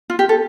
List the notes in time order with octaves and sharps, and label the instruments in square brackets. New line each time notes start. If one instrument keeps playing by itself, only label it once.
[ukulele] F4
G4
A4